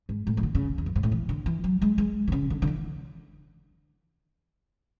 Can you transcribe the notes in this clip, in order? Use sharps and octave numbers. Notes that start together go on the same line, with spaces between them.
G#2
A2
E3
D3
C#3
E2
F#2
G#2
A2
E3
D3
E3
F#3
G#3
G#3
D3
C#3
D3
D3
E3